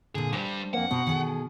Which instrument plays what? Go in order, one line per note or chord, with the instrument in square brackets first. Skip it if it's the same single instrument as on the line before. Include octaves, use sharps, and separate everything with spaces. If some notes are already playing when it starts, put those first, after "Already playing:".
[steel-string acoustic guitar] A#2 D3 [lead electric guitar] G#4
[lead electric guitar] G2 G3 [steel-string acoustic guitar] D4 C5
[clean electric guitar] F2 A#3 [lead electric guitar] F#5
[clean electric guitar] B2 [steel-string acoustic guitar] A#4 C5
[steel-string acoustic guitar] D#3 G#4 A4